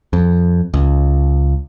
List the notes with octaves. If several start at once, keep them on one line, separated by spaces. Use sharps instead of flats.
F2
C#2